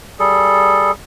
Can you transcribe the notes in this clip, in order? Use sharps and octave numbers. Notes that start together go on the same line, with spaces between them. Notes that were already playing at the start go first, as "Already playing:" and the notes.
G3 G#4 A4